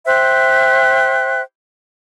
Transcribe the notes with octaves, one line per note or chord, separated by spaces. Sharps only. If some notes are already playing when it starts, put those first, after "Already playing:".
C5 E5 G5 F#6